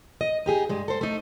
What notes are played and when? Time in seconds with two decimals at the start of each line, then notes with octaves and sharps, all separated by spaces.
0.21 D#5
0.46 D#4 G4 G#4
0.69 G2 G#3
0.88 A4 C5
1.01 A3 D#4